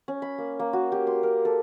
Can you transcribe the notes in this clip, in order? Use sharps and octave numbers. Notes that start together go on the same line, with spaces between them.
C#4
B5
A#3
A#3
F#4
G4
C6
A#4
A4